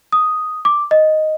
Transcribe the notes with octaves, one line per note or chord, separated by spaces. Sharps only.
D#6
D6
D#5